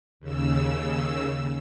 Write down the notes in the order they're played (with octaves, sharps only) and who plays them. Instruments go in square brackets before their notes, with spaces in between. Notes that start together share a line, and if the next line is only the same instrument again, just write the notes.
[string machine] D#2 C#3 E6